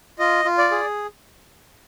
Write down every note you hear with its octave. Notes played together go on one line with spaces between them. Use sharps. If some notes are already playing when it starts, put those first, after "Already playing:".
F4 D#5
F4
D5
G#4